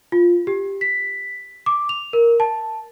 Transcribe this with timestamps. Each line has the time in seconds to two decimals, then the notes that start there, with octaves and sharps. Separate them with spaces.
0.12 F4
0.47 G4
0.81 B6
1.66 D6
1.89 F7
2.13 A#4
2.40 A5